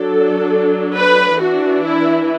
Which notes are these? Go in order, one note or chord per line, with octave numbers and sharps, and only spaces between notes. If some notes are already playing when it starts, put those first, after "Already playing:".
Already playing: F#3 D4 A4
B4
E3 D4 F#4
E4